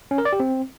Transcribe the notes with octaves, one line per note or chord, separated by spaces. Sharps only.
C#4
A#4
D5
G4
C4